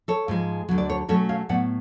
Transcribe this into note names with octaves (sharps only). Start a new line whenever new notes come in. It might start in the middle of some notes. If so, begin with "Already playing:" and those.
A4 C#5
G#2 F3 G#3
D2 D3 F#3
D5
A4 C#5
B2 F#3 A3 C#4 A4 C#5
C#5 F5
A2 F#3 B3 D5 F#5